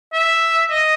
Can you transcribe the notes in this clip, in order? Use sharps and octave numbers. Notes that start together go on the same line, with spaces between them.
E5
D#5